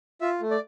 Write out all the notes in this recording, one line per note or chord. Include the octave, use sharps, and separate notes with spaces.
F4 E5
A3
D5